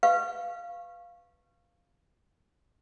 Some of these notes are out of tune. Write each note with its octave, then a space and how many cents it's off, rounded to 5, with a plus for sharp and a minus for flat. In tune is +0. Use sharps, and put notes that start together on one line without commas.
B4 +0 F5 +0 C#6 -20